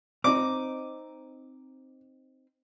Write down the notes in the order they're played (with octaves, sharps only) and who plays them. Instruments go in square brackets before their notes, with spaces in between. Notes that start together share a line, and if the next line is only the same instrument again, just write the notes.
[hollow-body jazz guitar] C4 D#4 [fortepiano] D6